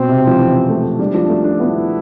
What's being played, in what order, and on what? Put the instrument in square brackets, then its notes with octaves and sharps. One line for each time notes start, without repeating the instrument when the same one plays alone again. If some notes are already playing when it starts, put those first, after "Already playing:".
Already playing: [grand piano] B2 [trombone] C4
[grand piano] C3
F3
E3
A3
[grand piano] G3 [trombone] D4
[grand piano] F3
A3
D4
[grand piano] B3 [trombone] E4